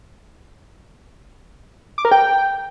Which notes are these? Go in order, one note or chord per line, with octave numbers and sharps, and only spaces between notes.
D6
A#4
G5